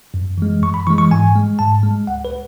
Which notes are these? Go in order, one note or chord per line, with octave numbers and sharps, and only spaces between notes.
F#2
E3 G#3
F#2 C#6
B5
E3 G#3 C#6
C#6
G#2 G#5
G#3
G#2 A5
G#3
C#2 F#5
B4